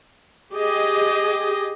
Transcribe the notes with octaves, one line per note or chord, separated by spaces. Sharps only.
G4 G#4 D#5